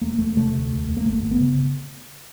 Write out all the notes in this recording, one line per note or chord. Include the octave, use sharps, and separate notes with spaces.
E1 A#3
E1 A3
C3 A3
D2
E1
E1
A#3
G1 A3
G1
B3
C#3